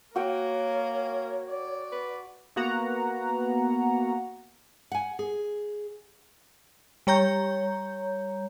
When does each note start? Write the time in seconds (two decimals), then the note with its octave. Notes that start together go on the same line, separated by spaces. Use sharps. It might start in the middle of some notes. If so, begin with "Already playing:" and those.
0.16 A#3 F#4 A#4 C#5 G5
1.50 D5
1.92 B4
2.56 A#3 B3 F#4 F#5 A#5
4.92 F#5 G#5
5.19 G#4
7.07 G3 C#5 A#5 G6